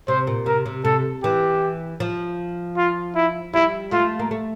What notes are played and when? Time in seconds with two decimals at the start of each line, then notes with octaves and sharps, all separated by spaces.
0.08 C3 C5
0.27 A#2
0.46 C3 A#4
0.66 C3
0.85 C3 A4
1.23 E3 G4
2.00 F3
2.77 F4
3.15 E4
3.54 G3 E4
3.92 A3 F4
4.19 A#3
4.31 A3